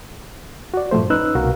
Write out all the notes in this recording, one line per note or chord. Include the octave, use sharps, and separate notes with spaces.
F#4 D5
G2 A#2 F3 A3 C5
C#4 D#4 B4 E6 F#6
C2 B2 F#4 A#4 F5